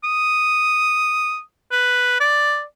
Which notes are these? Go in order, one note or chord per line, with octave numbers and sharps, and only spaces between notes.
D#6
B4
D5